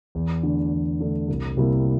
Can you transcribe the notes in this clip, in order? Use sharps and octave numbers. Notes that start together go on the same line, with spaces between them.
E2
D3 A3 D4
E2
D3 A3 D4
C2
C3 G3 A#3 E4